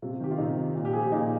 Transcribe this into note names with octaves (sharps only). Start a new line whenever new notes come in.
C3 F4
D#3 G4
F4
C3 D#4
D#3
A#2
G4
F3 G#4
G4
A#2 D#4